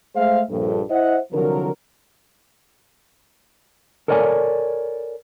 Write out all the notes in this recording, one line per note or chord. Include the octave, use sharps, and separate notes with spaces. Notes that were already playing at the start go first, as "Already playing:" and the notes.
G#3 A3 G#4 C5 E5 F5
A#1 G2 A4
E4 C5 D#5 E5 F#5
C2 D3 F3 F#3 A#4
A4 A#4 C#5 D5 G5 G#5